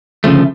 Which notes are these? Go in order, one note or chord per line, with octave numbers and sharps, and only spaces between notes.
D2 C#3 F3 A3